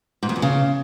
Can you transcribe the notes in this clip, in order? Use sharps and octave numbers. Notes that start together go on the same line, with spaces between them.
G#2
F2
E2
C#3